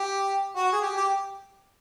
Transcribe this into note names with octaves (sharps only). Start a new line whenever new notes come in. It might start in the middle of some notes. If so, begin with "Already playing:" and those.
Already playing: G4
F#4
G#4
G4
G4